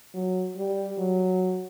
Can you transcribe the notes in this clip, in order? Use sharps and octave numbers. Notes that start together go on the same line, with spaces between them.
F#3
G3
F#3